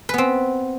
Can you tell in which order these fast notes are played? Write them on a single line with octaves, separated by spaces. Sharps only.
B4 B3 C4